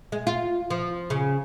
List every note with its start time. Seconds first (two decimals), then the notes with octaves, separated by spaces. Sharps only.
0.12 G#3
0.27 F4
0.70 F3
1.10 C#3